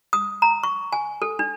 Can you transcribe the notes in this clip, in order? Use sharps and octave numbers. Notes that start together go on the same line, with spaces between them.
D#6
A#5
C#6
G#5
A4
D4